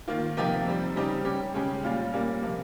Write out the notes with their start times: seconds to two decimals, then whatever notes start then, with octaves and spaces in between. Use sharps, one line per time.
0.08 D#3 A#3 F4
0.37 C3 F3 A#3 D#4 G4
0.66 C3 G3 C4
0.96 C#3 G3 C4 D#4 G4
1.25 G3 C#4 G4
1.54 C#3 G#3 C#4 G4
1.83 A#2 G3 C#4 F4
2.13 A#2 G3 A#3 C#4
2.42 C3 F3 A#3